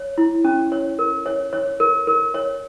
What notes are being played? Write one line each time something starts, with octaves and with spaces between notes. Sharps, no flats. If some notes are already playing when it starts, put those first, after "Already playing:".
Already playing: C#5
E4
C#4
C#5
A#4
C#5
C#5
A#4
A#4
C#5